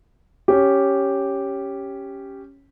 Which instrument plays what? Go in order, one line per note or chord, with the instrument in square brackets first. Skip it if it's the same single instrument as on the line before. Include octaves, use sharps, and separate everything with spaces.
[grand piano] C#4 G4